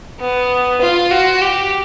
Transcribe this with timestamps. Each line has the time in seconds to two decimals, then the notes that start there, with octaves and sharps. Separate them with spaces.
0.20 B3
0.81 F4
1.11 F#4
1.41 G4